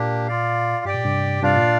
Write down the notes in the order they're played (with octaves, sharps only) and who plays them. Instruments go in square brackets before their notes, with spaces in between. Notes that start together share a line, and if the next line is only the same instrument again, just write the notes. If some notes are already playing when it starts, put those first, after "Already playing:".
Already playing: [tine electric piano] A#2 [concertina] A#3 D4 G4
[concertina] F4 D5 F5
[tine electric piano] G2 [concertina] G4 D5 G5
[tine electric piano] A#2
G2 C3
[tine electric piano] G2 C3 [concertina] D4 F4 D5 F5
[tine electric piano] A#2